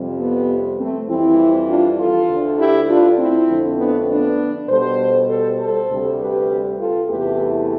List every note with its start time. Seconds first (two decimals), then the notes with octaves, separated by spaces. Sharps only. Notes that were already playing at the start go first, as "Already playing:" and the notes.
Already playing: F2 C3 G3
0.18 B3
0.78 A3 C4
1.08 F2 E3 G3 C4 E4
1.68 D4 F4
1.98 F4 A4
2.29 D2 D3 A3
2.58 E4 G4
2.89 D4 F4
3.18 C4 E4
3.49 F2 D3 A3
3.78 B3 D4
4.08 B3 D4
4.69 B2 G3 A4 C5
5.28 A4 C5
5.59 A4 C5
5.89 D2 C3 G3
6.19 G4 B4
6.79 F4 A4
7.09 E2 C3 E3 A3 G4 B4